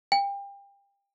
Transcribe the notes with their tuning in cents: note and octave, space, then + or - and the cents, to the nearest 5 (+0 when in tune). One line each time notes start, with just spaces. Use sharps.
G5 +30